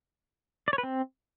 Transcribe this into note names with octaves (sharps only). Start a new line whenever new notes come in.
D5
C#5
B4
C4